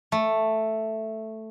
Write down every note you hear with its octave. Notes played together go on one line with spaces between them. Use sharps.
A3